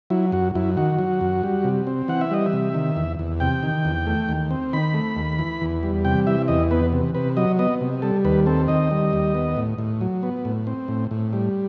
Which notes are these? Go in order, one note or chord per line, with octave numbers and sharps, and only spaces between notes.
F#3 E4
F#2 F#4
F#2 E4
D#3 F#4
F#3
F#2
G3
C3
C4
E3 F#5
E5
G3 D#5
E5
C3
D#3
E2
E2
C3 G5
D#3
E2
A3
D#2
C4
D#3 B5
A3
D#2
E3
E2
G3
C3 G5
E3 E5
E2 D#5
B3 B4
C3
C3 B4
F#3 D#5
B3 D#5
C3
G3 A4
D#2 B4
C4 A4
D#3 D#5
G3
D#2
B3
A2
A2
F#3
B3
A2
C4
A2
A2
G3